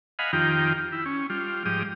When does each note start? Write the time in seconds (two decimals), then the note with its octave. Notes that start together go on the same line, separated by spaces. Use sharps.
0.19 D#5 F5 F#5 G#5 B5
0.33 F2 D#3 D#4 F4 G4 G5
0.92 E4
1.06 C#4
1.30 G3 F4
1.65 G#2 F3 G3 G4 D#6